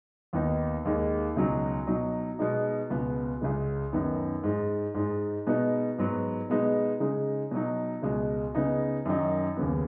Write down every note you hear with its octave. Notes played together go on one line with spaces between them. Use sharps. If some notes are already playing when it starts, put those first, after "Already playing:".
D#2 D#3 B3 D#4
D#2 D#3 G#3
C#2 B2 F#3 D#4
B2 F#3 D#4
B2 G#3 B3 D#4
C#2 B2 B3
C#2 C#3 G#3
F#2 D#3 B3 D#4
G#2 G#3 D#4
G#2 G#3 D#4
B2 G#3 B3 D#4
G#2 F#3 B3
B2 G#3 B3 D#4
C#3 G#3 D#4
B2 F#3 D#4
C#2 B2 G#3
C#3 B3 D#4
F#2 D#3 F#3 D#4
D#2 C#3 B3